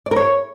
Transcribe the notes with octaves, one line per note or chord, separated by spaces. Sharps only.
D5
A#4
C#5